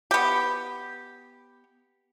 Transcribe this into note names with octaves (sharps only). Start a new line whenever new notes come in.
B3 G4